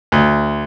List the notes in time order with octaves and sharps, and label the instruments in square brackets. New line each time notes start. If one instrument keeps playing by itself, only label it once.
[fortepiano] D2